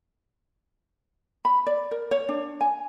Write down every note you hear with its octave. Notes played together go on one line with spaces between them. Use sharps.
B5
D5
A#4
C#5
D4
G#5